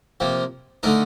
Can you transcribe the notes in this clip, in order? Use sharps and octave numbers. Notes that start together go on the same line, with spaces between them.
C3 F3 A#3
D3 A3 D#4 A#4